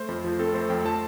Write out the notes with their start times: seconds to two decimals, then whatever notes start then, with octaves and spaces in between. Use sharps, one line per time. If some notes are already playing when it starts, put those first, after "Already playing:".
Already playing: A3 C5
0.09 F2
0.24 F3
0.39 C4 A4
0.54 A3 C5
0.70 F2 G5
0.85 F3 A5